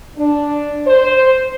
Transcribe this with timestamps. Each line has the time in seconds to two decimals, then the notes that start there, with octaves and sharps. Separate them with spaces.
0.17 D4
0.87 C5